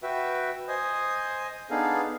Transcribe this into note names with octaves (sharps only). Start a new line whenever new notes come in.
F#4 B4 E5 G5
C5 D#5 G#5 D#6
B3 D4 D#4 G#4 A4 F5